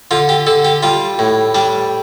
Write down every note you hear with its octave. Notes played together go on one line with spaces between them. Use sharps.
D3 F4
G4
D3 A4
G4
G3 F4
A2
G3 D4